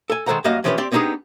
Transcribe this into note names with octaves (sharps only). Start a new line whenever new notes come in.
A4 G#5
D#3 G#3 A4 C5 F#5 A#5
F#2 G3 A#3 F#4 D#5 F5
E3 F3 G3 C#4 G4 B4
C4 G4 D5 C6
B3 C4 D4 D#4 G4 G#4